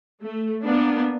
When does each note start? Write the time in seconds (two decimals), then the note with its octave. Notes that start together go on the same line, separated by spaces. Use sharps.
0.21 A3
0.63 A#3 B3 D4